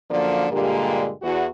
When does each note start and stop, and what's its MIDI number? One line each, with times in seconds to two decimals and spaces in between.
0.10 0.46 42
0.10 0.46 50
0.10 0.46 53
0.10 0.46 58
0.10 0.46 74
0.52 1.11 43
0.52 1.11 46
0.52 1.11 50
0.52 1.11 56
0.52 1.11 58
0.52 1.11 67
1.22 1.46 40
1.22 1.46 66